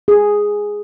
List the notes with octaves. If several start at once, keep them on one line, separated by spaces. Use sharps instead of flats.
G#4